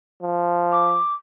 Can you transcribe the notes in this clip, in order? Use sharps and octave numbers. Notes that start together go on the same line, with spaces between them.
F3
D6